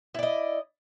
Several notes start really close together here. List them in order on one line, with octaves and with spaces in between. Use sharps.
E4 D5 D#5